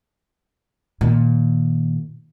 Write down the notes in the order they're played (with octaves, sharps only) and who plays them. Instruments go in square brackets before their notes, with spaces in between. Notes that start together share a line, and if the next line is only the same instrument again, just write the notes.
[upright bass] A#2 D#3